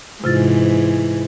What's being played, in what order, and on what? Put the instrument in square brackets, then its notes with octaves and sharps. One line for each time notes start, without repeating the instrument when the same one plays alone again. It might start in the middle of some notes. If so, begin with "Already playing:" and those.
[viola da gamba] G#2 E3 [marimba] C3 F4 A6